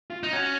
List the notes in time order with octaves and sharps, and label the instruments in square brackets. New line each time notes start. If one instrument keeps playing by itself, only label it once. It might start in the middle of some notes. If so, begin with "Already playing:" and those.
[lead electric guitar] F4
[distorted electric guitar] D#4
[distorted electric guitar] C#4 [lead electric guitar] F#4